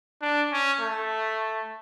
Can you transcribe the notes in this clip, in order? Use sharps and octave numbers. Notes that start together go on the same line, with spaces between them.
D4
C#4
A3